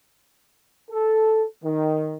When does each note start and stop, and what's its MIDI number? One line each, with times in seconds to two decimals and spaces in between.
0.91 1.44 69
1.64 2.17 51